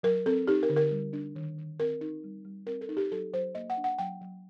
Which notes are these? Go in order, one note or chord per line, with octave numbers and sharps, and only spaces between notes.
F#3 A#4
C4 A4
D#4 G4
A#4
D3
A#4
G3
D4
D#3
D#3
C4 A#4
D#4
G3
G3
C4 A#4
A4
D#4
G4
F#3 A4
F#3 C5
A#3 D#5
F#5
D4
F#5
F#3 G5
F#3